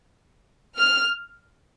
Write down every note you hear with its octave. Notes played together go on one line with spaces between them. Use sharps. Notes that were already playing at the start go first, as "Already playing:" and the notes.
F6